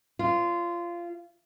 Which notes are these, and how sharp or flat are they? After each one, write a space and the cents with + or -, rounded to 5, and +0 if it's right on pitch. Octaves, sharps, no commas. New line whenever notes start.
F4 -20 C#5 +25